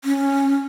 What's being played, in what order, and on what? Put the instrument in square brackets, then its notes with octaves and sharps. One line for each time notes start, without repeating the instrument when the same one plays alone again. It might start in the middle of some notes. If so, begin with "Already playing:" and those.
[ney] C#4